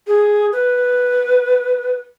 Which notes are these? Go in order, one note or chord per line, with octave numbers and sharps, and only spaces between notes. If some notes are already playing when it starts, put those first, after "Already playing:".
G#4
B4